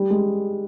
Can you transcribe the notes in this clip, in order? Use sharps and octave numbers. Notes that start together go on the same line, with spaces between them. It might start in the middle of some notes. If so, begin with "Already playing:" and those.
Already playing: G3
G#3